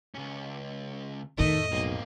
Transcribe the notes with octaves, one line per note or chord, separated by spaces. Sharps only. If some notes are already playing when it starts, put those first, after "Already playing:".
C#2 C#4
F2 A2 D#3 A3 D#5
B1 A#3 C4